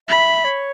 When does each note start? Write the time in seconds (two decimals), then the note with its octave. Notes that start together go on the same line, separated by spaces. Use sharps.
0.08 E5 B5
0.44 C#5